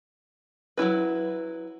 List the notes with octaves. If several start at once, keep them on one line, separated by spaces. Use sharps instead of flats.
F#3 A3 E4 B4